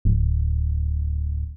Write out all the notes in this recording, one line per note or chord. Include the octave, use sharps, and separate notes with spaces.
D1